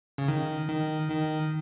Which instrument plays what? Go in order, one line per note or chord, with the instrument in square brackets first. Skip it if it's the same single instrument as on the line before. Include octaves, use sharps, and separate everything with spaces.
[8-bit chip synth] C#3
D#3
D#3
D#3